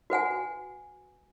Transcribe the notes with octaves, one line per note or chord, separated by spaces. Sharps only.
F#4 B4 F#5 G#5